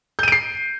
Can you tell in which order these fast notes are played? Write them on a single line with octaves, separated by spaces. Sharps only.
G6 D#7 D7 C7